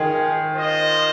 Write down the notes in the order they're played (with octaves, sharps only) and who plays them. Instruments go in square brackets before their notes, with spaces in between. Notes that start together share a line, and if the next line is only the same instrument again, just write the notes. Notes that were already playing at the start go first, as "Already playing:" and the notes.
Already playing: [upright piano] D#3 [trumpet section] G#3 F4 G#4
[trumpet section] F4 C5 D#5